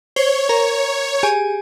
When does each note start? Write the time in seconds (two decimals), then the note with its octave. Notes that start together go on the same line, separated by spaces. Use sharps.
0.16 C5 C#5
0.49 A#4 A#5
1.23 G4 G#4 G#5